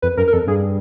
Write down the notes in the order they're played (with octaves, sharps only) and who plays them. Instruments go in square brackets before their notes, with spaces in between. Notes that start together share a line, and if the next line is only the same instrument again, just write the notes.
[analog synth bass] F2 [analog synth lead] B4
[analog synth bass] F#2 [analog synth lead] A#4
[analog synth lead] A#4
[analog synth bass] F2 [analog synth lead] A4
[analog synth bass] G2 [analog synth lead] G#4